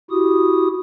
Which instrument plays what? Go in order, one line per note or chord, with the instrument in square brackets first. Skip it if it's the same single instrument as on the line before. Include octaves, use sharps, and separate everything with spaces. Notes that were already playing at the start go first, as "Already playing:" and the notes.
[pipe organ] E4 F#4 G4 D#6